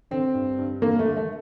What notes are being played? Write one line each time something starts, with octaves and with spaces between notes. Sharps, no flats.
D3 C4
G2
G2
D3 A#3
A3
D3
A3